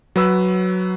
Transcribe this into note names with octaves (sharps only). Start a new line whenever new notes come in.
F#3 B4 E6